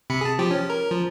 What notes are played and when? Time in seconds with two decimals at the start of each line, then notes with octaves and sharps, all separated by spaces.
0.10 C3 B5 C#7
0.21 G#4 A5
0.39 F3 G4
0.51 C#4
0.70 A#4
0.91 F3